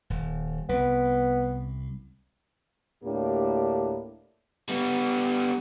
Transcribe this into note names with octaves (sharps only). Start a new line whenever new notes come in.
D#1
C2 B3
D2 A2 A#3 D4 G4
G3 B3